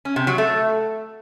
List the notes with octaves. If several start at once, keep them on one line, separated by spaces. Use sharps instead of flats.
C#4
C3
F#3
A3